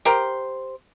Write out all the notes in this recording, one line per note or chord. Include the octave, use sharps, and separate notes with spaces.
G4 A#4 C5